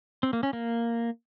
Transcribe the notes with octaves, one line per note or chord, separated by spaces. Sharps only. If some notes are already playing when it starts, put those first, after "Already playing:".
C4
A#3
C#4
A#3